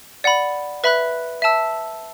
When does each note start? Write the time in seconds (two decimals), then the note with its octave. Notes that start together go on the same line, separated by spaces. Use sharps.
0.24 D5 F#5 B5
0.84 B4 E5 B5 F#6
1.42 E5 A5 E6